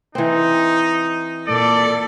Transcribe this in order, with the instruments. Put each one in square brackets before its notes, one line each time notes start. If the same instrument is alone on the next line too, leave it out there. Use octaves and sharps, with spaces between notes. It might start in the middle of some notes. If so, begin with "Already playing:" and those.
[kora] E3 C4 [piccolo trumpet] D#4
[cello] A#2 A4 [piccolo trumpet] D5